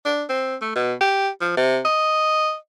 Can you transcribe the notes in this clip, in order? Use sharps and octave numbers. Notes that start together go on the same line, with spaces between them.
D4
C4
A3
B2
G4
F3
C3
D#5